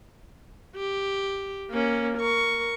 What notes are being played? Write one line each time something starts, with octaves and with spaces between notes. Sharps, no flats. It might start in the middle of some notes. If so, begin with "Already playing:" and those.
G4
A#3 C#4
A#4 C#6